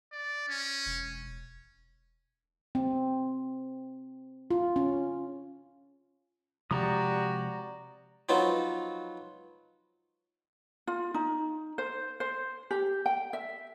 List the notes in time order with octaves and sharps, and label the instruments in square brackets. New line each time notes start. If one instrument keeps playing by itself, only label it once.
[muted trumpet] D5
C#4
[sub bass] E1
[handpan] C4
F4
C#4
[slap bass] C3 F3 G#3 [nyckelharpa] F#4 G4 [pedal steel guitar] D5 A#5 D#6
[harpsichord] F3 F#3 B3 D#4
[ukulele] F4
D#4
C5
C5
G4
G5
E5